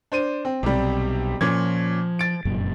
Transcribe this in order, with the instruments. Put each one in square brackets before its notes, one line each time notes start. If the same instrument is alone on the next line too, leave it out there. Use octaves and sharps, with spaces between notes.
[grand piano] D4 C5 D#7
C4
[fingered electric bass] B1 [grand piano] C3 G3
[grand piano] A#2 C#4 G#6 [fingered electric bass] F3
[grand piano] A6 D7
[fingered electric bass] F1 F#2 A#2